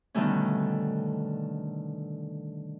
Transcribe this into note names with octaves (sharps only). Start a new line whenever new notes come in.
B2 D3 D#3 G3 A3 C#4